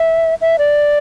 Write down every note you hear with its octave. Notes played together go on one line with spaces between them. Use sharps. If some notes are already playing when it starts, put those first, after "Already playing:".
Already playing: E5
E5
D5